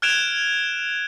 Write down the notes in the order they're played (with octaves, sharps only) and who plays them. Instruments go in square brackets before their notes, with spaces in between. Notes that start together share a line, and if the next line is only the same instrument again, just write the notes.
[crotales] F6 F#6 G#6 D7 E7 F7